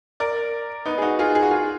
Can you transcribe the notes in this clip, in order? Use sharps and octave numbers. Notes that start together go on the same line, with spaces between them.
A#4 D5
B3 D#4
G#4
D#4 F#4
F4 G#4
G#4
F#4
F4 G#4